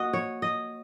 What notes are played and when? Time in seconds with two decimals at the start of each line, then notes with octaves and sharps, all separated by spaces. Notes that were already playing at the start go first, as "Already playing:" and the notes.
Already playing: A#3 F#4 D#5
0.13 C#5
0.42 D#5